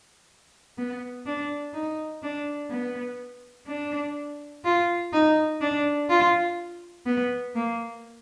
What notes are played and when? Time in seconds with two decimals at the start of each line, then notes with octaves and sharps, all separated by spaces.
0.78 B3
1.26 D4
1.74 D#4
2.22 D4
2.70 B3
3.67 D4
4.64 F4
5.13 D#4
5.61 D4
6.10 F4
7.06 B3
7.55 A#3